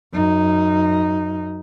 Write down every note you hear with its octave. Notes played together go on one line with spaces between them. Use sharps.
F#2 D#4